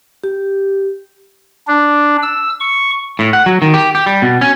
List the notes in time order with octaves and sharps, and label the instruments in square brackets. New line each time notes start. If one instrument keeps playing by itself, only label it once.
[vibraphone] G4
[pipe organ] D4
E6
C#6
[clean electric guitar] A2
F#5
F#3
D#3
G4
G4
G3
B2
C#4